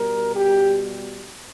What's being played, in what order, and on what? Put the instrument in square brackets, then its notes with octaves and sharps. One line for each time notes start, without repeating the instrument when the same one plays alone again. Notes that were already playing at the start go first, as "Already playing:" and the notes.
Already playing: [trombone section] B2 G3 A#4
G4